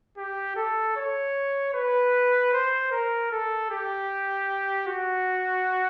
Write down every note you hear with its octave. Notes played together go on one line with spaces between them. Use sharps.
G4
A4
C#5
B4
C5
A#4
A4
G4
F#4